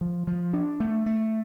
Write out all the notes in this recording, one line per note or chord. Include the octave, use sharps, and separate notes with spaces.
F3
F3
D4
A3
A3